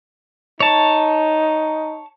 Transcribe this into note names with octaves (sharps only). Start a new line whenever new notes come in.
D#4 C#5 A5